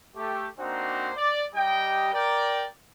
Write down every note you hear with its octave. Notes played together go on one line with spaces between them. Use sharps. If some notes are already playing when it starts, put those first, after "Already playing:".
A3 G4
A#3 C4 D4 D#4 F#4 C5
D5
G3 D#4 G4 D#5 G5
A#4 D5 G5